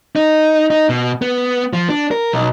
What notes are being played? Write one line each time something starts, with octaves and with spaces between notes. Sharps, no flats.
D#4
D#4
B2
B3
F3
D4
A#4
B1